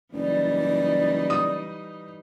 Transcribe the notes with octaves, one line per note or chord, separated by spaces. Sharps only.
F#1 E3 G3 D#4 D5
D#6